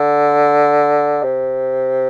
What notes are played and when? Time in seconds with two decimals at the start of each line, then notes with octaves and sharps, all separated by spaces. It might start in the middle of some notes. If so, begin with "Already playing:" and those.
Already playing: D3
1.23 C3